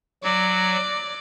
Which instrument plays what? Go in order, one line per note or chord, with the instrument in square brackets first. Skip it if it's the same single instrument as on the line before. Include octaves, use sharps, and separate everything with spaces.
[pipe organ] F#3 [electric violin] D5